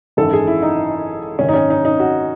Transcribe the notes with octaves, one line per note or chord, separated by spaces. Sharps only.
G#1 F#2 E3 A4
G#4
E4
D#4
G#1 F#2 D#3 C#4
D#4
C#4
D#4
D#4
F#4